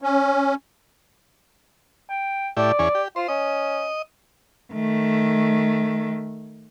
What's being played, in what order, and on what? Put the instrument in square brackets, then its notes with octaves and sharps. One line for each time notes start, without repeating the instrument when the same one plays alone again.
[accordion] C#4
[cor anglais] G5
[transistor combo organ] A2 E4 G4 [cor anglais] D5
[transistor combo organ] E2 C#4 G#4
G4
[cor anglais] F4 [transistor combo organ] C5
[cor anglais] C#4 [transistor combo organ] D#5
[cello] D#3 A3